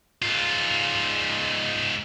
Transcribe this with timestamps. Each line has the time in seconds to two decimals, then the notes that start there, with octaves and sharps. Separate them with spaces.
0.22 G#2 F4